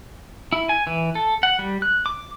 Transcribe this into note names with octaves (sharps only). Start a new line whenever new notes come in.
E4
G#5
E3
A4
F#5
G3
F#6
D6